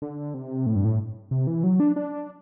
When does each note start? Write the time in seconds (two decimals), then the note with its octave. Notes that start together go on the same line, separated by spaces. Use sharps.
0.02 D3
0.34 C3
0.66 A2
0.76 G2
0.85 A2
1.31 C3
1.47 E3
1.64 F#3
1.80 D4
1.96 D4